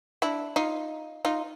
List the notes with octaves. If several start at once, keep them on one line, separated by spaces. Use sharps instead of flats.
D4 E4
D#4 F4
D#4 F4